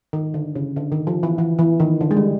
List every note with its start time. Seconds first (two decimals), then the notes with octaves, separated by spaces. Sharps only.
0.13 D#3
0.34 D3
0.55 C#3
0.76 D3
0.92 D#3
1.07 F3
1.23 E3
1.38 E3
1.59 E3
1.80 D#3
2.01 D3
2.11 G#3
2.16 G3